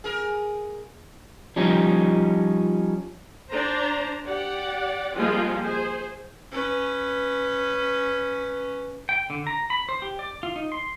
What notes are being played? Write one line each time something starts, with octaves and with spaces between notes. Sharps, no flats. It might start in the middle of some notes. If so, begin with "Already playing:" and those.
G#4 A#4
F3 G3 C#4 D#4
D4 C5 A#5
G4 D5 F#5
F3 G3 G#3 A#3 C4 F4
G#4 C5
C#4 B4
G5
D3
A#5
B5
C5
G4
D5
F4
D#4
C6